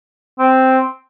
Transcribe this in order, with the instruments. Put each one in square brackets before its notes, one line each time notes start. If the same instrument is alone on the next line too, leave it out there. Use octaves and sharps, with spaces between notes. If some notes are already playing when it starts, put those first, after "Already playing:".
[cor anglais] C4